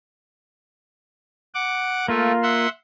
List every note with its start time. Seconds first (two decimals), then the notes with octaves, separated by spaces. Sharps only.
1.55 F#5 D6
2.08 A3 A#3 F4
2.43 E5 F#5 C6